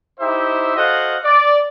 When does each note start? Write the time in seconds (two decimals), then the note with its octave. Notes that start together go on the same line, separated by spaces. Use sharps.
0.20 D#4 E4 G4 C5 E5
0.77 F#4 A4 C5 D#5 F5 F#5
1.25 D5